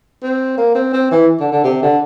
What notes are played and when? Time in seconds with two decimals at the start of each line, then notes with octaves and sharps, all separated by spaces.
0.23 C4
0.57 A#3
0.75 C4
0.93 C4
1.11 E3
1.40 D3
1.52 D3
1.64 C3
1.82 D3